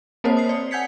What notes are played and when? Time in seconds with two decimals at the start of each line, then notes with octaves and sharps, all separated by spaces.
0.24 A#3 C4 A#4 C5 C#5 A5
0.37 D#6 C7
0.49 D5
0.71 F#5 G#5 G6 G#6 B6 C#7